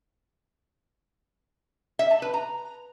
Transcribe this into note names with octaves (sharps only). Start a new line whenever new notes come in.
E5
A5
B4
A#5